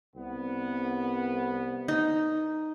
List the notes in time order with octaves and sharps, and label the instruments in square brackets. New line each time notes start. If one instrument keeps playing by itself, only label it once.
[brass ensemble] C2 B3
[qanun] D#4